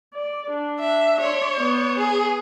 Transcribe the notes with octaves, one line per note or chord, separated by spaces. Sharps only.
D5
D4
E5
C#5 D5 C6
B3
G#4